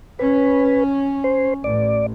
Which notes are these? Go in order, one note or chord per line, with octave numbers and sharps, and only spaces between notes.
C#4 B4
C5
A1 D5